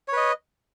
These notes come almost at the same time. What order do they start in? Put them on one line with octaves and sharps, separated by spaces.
C#5 B4 D#5